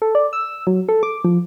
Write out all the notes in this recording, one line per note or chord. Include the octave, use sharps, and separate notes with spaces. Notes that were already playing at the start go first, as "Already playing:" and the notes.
A4
D5
E6
F#3
A4
D6
F3